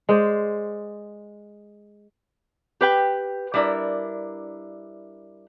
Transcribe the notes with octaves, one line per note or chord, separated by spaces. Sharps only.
G#3 C5 D5
G4 B4 G5
G3 D4 E4 A#4